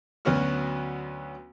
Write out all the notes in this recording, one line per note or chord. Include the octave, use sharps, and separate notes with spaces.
D2 F#3 B3 C#4 F#4 F6